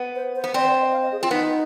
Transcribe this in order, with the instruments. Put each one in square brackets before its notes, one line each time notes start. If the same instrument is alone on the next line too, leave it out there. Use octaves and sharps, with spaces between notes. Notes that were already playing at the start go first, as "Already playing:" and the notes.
Already playing: [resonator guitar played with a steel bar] B3
[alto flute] C5
C5
[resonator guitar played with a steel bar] B3
[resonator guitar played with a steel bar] C4 [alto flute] D5
[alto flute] C5
D5
D#5
F5
D#5
G#4
[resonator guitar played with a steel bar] C4 [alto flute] F4
[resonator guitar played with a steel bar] B3 [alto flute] D#4